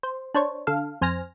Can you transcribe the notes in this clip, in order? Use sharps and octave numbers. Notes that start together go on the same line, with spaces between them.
C5
D4 C5 C#5
D3 A4 F5
F2 C5 G#5 F6 A#6